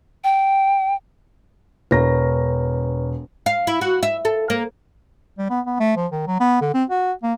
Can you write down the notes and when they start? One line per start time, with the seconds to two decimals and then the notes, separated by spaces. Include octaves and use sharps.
0.24 G5
1.91 E1 B4 C#5 A#5 A#6
3.46 F5
3.67 E4
3.81 F#4
4.03 E5
4.25 A4
4.50 A#3
5.38 G3
5.50 B3
5.66 B3
5.80 A3
5.96 F3
6.12 D#3
6.27 F#3
6.40 B3
6.61 D3
6.74 C4
6.90 F#4
7.23 A#3